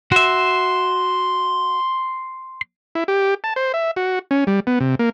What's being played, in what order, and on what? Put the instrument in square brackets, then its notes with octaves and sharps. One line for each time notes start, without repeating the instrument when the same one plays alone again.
[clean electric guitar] F#4 E5 [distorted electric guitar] C6
[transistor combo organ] E4
G4
A5
C5
E5
F#4
C#4
G3
B3
C3
A#3